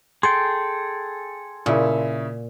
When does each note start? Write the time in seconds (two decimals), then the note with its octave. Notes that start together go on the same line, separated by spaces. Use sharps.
0.23 G#4 A4 G5 C6
1.66 A#2 C#3 E4